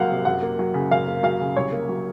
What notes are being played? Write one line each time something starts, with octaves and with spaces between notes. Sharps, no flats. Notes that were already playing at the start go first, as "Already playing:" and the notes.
Already playing: C2 C3 F#3 A#3 F5 F#5
C3
F#2 F#5
A#3
F#3
C#3
F#2 F5
A#3
F#3 F5
C#3
C2 C#5
A#3
F#3